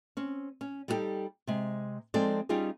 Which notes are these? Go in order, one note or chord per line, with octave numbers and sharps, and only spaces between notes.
C4 C#4
C#4
G3 D#4 E4 G4 A4
C3 G#3
F3 G#3 C4 D#4 A4 D5
G3 C#4 D#4 F4 G4 G#4